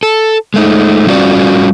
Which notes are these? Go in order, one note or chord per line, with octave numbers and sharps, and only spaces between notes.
A4
G#3 A3 D#4
G3 C#4 F4 F#4 D5